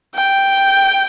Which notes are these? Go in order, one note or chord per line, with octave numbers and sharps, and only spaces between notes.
G5